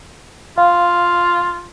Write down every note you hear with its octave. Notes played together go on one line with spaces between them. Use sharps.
F4 F5